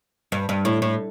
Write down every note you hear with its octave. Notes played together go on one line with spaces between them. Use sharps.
G2
G2
A2
A2